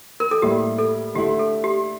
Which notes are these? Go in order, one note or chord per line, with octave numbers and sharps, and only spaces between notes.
A#4
A4
A2 G3 A#3 E4 G4
A4
D3 A3 E4 G4
A4
G4